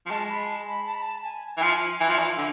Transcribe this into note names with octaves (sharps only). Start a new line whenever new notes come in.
F3
G#3 A5
B5
A5
B5
A5
B5
A5
G#5
E3
F3 G#5
E3
F3
D5
E3
E5
F5
D3 G#5